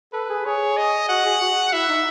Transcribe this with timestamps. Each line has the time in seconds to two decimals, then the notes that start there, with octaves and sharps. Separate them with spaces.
0.13 A4 B4
0.29 G#4
0.45 G#4 C#5
0.77 D#5
1.09 F#4 F#5
1.25 G#4
1.41 F#4
1.73 E4 E5
1.89 D#4